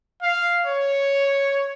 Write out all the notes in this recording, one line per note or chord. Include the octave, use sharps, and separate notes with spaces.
F5
C#5